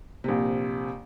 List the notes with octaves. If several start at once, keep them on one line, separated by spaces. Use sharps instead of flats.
A#1 C3